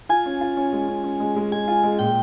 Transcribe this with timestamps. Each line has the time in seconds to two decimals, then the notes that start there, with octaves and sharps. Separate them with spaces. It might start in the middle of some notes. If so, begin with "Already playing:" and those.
0.09 F4 G#5
0.26 C#4
0.41 F4
0.57 C#4
0.73 G#3
0.88 C#4
1.04 C#4
1.20 G#3
1.36 G#3
1.52 G#3 G#5
1.68 F4
1.84 G#3
1.99 A#2 G5